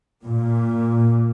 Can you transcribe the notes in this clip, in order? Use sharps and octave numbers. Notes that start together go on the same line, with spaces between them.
A#2